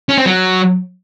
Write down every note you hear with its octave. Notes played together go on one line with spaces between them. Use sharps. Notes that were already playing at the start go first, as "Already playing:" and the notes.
C#4
C4
F#3